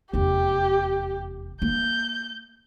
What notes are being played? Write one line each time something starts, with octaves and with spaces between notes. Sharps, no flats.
F1 E2 G4
A#3 G6